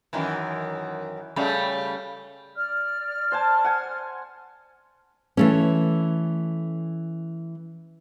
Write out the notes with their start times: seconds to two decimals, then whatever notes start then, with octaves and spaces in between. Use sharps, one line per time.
0.13 F#2 D#3 E3
1.36 C#3 G3 A3
2.56 D5 F6
3.32 C5 G#5 A5
3.65 F#5 G#5
5.37 E3 A3 C#4